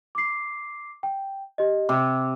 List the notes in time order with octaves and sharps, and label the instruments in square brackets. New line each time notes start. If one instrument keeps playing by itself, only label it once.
[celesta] D6 C7
G5
G4 D#5
[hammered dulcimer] C3 [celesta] D6